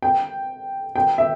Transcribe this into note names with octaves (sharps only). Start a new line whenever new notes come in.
G5
G5
E5